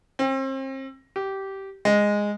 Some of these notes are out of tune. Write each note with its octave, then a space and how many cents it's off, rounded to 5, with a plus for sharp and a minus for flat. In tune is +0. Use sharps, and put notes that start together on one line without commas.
C4 +35
G4 -15
G#3 -10